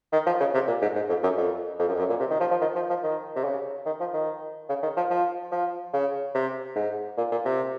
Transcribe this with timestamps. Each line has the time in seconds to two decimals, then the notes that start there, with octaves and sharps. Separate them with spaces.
0.13 D#3
0.26 F3
0.40 C#3
0.54 C3
0.68 A#2
0.82 G#2
0.95 G#2
1.09 F2
1.23 F#2
1.37 F2
1.79 F2
1.88 F#2
1.95 F2
1.99 F#2
2.09 A#2
2.20 C3
2.31 D#3
2.40 F3
2.51 F3
2.61 D#3
2.75 F3
2.89 F3
3.03 D#3
3.36 C3
3.44 C#3
3.86 D#3
4.00 F3
4.14 D#3
4.69 C#3
4.83 D#3
4.96 F3
5.10 F3
5.52 F3
5.93 C#3
6.35 C3
6.76 G#2
7.17 A#2
7.32 A#2
7.45 C3